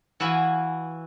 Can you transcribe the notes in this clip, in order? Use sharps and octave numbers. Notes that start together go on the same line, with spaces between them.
E3 E4 F#4 B4 F5 G#5